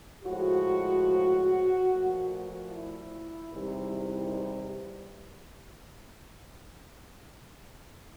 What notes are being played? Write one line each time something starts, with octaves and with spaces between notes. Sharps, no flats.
A2 F3 G#3 F#4
A#2 F3 A3
E4
E2 C3 D#3 G3